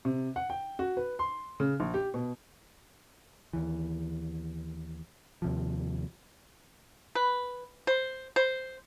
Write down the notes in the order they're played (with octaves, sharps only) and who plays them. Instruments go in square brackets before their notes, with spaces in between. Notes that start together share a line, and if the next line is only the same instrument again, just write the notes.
[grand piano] C3
F#5
G5
F#4
B4
C6
C#3
A#1
G4
B2
[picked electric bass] D#2 E3
D#2 C3 F3
[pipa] B4
C5
C5